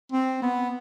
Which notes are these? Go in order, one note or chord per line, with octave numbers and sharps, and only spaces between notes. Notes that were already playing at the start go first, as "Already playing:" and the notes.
C4
B3